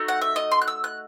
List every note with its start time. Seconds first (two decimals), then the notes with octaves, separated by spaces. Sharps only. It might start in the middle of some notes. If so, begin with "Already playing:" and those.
Already playing: A3 D#4 F#4
0.08 F#5
0.22 E5
0.36 D#5
0.51 C6
0.62 F#6
0.68 E6
0.84 F#6